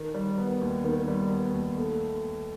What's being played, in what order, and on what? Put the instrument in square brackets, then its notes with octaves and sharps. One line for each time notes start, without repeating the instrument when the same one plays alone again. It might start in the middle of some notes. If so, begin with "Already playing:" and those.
Already playing: [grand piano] D#3
G3
B3
D#2
D#3
G3
B3
D#2
A3